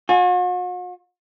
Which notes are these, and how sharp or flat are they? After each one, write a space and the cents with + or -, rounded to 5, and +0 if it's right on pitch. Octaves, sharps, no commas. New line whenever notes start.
F#4 -45 G#5 +0